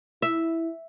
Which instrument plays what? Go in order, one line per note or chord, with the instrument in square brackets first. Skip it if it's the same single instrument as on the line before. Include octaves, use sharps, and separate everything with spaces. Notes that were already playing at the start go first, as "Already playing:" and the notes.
[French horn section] E4 [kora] E5